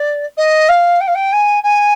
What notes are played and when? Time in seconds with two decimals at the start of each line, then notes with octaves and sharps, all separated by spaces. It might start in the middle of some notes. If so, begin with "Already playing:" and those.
Already playing: D5
0.37 D#5
0.69 F5
1.01 G5
1.07 F5
1.15 G5
1.33 G#5
1.63 G#5